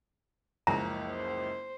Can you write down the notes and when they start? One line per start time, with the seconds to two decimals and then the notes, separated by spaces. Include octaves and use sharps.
0.67 F#1 C#2 F3 A#5
1.09 C5